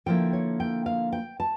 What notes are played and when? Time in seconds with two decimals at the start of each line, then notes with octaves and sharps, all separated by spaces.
0.06 D3 F3 A#3 E4 G5
0.33 C#5
0.60 G5
0.86 F5
1.13 G5
1.40 A5